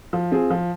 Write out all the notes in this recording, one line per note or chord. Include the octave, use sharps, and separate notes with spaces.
F3
C4 F4 G#4
F3